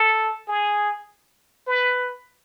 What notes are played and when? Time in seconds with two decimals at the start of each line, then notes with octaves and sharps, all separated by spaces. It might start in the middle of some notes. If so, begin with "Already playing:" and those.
Already playing: A4
0.48 G#4
1.67 B4